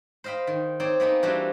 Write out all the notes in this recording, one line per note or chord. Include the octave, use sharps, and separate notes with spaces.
C5 D#5 F5 G5 B5
D#3
C4 D#4 C#5 D5
A#3 B3 D#4 G#4
E3 G3 C4 D4 F4 F#4